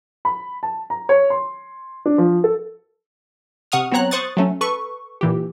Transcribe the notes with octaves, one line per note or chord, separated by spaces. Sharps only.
B5
A5
A#5
C#5
C6
D4
F3
A4
C3 F#5 C#6 D#6 F6
F#3 B3 C4 C#5 A#5 F#6
C5 C#6 D#6 F#6 A6
F#3 A3 C#4
A4 B4 C#6
A#2 E3 G4